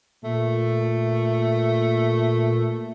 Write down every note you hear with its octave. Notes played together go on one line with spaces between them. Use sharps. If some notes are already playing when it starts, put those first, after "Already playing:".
A#2 A3